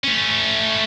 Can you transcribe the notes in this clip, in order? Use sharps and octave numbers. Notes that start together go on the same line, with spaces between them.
A3 C#4